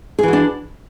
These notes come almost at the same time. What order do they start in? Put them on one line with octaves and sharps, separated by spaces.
G#4 E3 F#4 D4